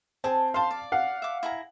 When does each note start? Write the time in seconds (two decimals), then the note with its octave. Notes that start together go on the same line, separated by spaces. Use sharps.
0.24 C4 G#4 A5
0.54 C5 F5 A5 C6
0.71 D5
0.92 F5 F#5
1.22 E5 D6
1.43 E4 G#4 A#5